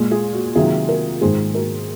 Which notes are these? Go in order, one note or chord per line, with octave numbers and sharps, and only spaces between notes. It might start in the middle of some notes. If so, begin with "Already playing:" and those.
Already playing: A#2 G#3
F4 G#4
F#4
C3 D#3 F#3 F4 G#4
F#4 A#4
G#2 D#3 G#3 G#4 C5
F#4 A#4